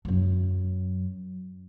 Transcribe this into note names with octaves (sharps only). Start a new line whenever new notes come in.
F#2 F#3